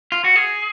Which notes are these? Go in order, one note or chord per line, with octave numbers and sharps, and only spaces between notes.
F4
F#4
G#4